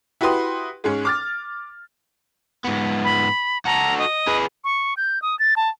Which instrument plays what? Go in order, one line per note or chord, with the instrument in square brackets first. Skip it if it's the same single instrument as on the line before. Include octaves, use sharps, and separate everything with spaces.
[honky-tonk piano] E4 F#4 G4 B4 C6 D#6
G#2 G#3 C#4
D6 F6 A6
[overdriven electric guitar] G#2 B3
[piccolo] B5
[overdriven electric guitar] F#4 A4 [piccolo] A#5
[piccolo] D#5
[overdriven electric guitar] G#4 B4
[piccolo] C#6
G6
D#6
A6
A5